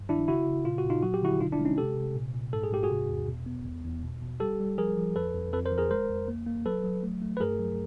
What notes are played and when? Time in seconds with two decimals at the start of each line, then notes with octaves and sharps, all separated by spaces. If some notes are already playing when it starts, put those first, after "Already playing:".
Already playing: G2
0.09 D#3 D4 E4
0.28 C#3 E4 F#4
0.47 C#3
0.65 A#2 F4
0.78 F#4
0.84 A#2
0.90 D#4 F4
1.03 F#3 F#4
1.14 G4
1.22 D3 E4 F#4
1.40 B2 D#4 F4
1.52 D4 E4
1.59 G#3
1.65 C#4 D#4
1.78 C3 G4 A4
1.96 C3
2.15 A#2
2.34 A#2
2.53 G#2 A4
2.64 G#4
2.72 G#2 G4
2.83 F#4 G#4
2.91 C3
3.09 E2
3.28 B2
3.46 B3
3.65 E2
3.85 E2
4.02 B2
4.21 B2
4.40 G3 G4 A4
4.60 G3
4.78 F3 G#4 A#4
4.97 F3
5.16 F2 A4 B4
5.34 F2
5.53 F2 A4 B4
5.65 A#4 C5
5.71 F3
5.78 G#4 A#4
5.91 G#3 A#4 C5
6.09 F2
6.28 A#3
6.47 A#3
6.66 F#3 A4 B4
6.84 F#3
7.03 A3
7.22 A3
7.37 B4
7.40 G2 G#4 A#4
7.59 F#3